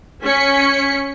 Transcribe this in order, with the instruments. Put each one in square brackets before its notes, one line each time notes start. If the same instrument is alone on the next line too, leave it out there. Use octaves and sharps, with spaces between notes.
[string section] C#4 B6 C#7